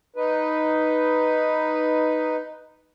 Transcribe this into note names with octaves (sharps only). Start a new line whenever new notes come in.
D#4 B4